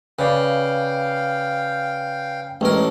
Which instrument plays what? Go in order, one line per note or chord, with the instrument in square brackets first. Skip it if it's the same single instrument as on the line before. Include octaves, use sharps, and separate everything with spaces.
[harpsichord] C#3 [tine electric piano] B4 D5 [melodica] F5 G5
[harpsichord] A1 A#4 [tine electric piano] G#3 [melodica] C4 D4 C#5